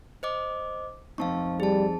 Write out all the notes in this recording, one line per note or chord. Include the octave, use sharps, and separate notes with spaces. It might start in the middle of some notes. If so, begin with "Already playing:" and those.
C5 D#5 D6
F2 C4 D#4 F5 A5 C#6
G3 G#4 A5